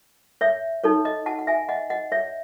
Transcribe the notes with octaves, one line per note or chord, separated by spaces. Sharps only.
C#5 E5
D#4 A4 C#5
D#5
F#5 A5
F#5
E5 G#5
D#5 F#5
D#5 F#5
C#5 E5